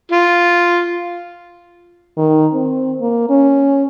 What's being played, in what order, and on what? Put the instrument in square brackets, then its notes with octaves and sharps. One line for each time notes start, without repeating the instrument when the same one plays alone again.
[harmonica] F4
[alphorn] D#3
C4
A#3
C#4